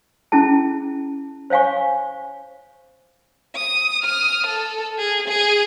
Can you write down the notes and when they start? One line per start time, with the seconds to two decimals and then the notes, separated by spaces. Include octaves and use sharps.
0.32 C#4 E4 G#4 A5
1.50 C5 C#5 F5 G#5 C#6
3.55 D#6
4.03 D#6 F6
4.47 A4
4.98 G#4
5.28 G#4